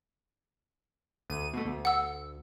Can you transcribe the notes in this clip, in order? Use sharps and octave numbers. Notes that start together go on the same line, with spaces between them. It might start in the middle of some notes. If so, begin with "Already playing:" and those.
D2 D#7
B2 A3
D2
F#5 E6